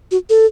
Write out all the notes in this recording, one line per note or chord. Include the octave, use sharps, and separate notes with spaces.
F#4
A4